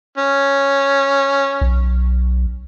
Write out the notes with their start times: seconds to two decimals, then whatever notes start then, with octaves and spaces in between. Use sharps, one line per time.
0.18 C#4
1.61 B1